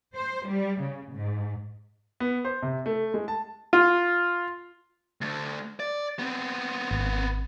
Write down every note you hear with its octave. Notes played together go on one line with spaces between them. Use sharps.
C5
G3
C#3
G#2
B3
C5
C3
A3
G#3
A5
F4
D2 A3
D5
B3 C4
G#1